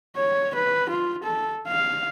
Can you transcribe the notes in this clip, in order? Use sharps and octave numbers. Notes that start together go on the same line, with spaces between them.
C#5
B4
F4
A4
F5